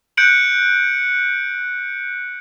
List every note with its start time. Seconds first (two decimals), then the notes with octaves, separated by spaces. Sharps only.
0.17 F#6 G6 C#7 D7 F#7